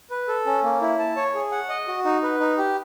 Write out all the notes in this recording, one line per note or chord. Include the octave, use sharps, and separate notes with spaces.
B4
A4
C#4
A#3
E4
A5
C#5
G#4
F#5
D#5
F#4
D#4
B4
D#4
G4